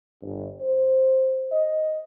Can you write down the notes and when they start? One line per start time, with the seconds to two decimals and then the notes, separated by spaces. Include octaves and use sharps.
0.22 G1
0.60 C5
1.52 D#5